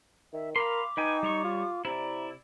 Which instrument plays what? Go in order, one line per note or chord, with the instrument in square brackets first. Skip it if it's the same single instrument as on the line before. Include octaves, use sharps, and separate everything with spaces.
[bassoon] D#3 [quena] E5
[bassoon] A#4 [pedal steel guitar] F5 B5 C6 [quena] D6
[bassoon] D#4 [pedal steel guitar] B4 G5 G#5
[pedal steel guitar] G3 C#5 C#6
[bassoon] F4
[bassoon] C3 [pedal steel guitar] E4 D5 [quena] A#5